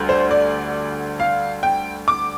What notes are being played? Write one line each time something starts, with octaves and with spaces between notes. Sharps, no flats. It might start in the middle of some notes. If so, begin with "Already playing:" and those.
Already playing: D2 D3 G3
C5
D5
F5
G5
D6